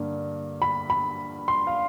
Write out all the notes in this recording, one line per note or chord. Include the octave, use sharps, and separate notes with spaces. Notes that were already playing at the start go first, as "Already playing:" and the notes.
Already playing: G2 D3 A#3 D4
B5
B5
C6
F5